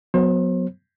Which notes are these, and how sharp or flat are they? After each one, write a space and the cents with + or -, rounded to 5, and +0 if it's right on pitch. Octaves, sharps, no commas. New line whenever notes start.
F#3 -15 B3 +10 C5 +40